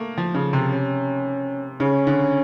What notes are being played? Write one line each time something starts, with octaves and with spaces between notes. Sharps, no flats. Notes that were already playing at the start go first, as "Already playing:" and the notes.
Already playing: A3 A#3
F3
C#3
C3
C#4
C#3 C#4
D3